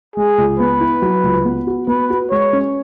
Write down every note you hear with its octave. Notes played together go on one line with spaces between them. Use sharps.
G#3 G#4
C#2
B3 B4
E4
F#3
C#2
B3
F#4
B3 B4
F#4
G#3 C#5
C#4